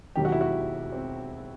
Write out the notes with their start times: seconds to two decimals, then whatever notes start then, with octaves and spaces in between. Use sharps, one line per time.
0.15 E1 D#2 D#3 F#3 G4
0.25 F#4
0.32 E4
0.41 F#4
0.92 C4